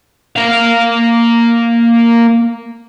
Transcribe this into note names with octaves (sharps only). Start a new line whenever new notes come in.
A#3 F5